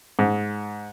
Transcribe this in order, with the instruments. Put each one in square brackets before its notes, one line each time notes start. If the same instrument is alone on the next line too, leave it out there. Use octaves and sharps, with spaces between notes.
[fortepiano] G#2